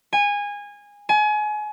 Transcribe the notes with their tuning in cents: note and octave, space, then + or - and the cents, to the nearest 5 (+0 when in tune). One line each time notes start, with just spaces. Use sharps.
G#5 -20
G#5 +30